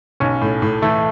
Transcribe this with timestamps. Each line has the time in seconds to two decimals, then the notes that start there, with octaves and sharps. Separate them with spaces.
0.20 B1 C#4
0.41 A2
0.62 A2
0.82 E3 A3